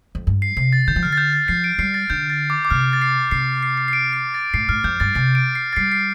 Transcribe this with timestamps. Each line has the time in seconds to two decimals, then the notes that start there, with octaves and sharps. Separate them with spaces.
0.15 F2
0.27 G2
0.42 C7
0.57 C3 C7
0.73 A6
0.87 D3 G6
0.96 F3
1.03 D3 F6
1.13 A6
1.18 G6
1.33 A6
1.48 F3 C7
1.64 D7
1.79 G3 C7
1.94 A6
2.10 D3 G6
2.30 A6
2.50 D6
2.65 D6
2.70 C3 F6
2.93 A6
3.02 C7
3.31 C3 C7
3.63 C7
3.77 C7
3.88 C7
3.93 D7
4.13 C7
4.34 A6
4.54 A2 C7
4.69 A2 F6
4.84 F2 G6
5.00 G2 A6
5.15 C3 C7
5.35 D7
5.55 C7
5.73 A6
5.76 G3 C7
5.92 C7